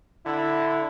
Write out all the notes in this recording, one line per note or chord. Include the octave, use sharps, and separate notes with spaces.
D3 E4